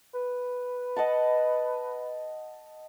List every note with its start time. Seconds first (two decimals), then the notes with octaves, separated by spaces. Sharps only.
0.14 B4
0.96 D#5 F#5 A5